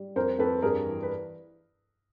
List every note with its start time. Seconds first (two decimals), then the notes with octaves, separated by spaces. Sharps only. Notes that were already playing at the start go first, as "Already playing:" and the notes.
Already playing: G3
0.16 F2 A#4 C5
0.39 F2 A4 B4
0.62 G2 G#4 A#4
0.86 E3
1.03 B4